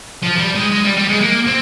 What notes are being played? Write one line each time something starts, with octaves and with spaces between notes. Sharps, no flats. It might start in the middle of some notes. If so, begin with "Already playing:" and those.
F3
G3
G#3
G#3
G3
G3
G#3
A#3
C4